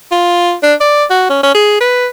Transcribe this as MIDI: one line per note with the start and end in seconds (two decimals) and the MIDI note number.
0.12 0.54 65
0.63 0.74 62
0.81 1.04 74
1.10 1.25 66
1.30 1.42 61
1.43 1.54 61
1.54 1.77 68
1.80 2.07 71